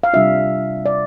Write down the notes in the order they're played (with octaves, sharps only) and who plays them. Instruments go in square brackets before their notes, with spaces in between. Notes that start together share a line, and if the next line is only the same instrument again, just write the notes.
[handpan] F5
C3 G3 D4 F4 E5
D5